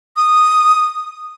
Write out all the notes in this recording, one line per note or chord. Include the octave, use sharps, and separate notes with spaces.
D#6